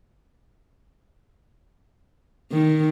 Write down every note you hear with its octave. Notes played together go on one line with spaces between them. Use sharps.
D#3